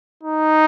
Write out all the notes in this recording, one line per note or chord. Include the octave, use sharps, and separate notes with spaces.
D#4